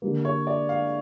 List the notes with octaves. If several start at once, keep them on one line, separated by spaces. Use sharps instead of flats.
D3 G3 A#3
C#5
D5
F5